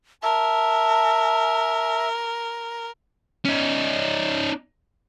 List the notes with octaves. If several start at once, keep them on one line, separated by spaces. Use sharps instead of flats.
A#4 E5 A5
C#4 D#4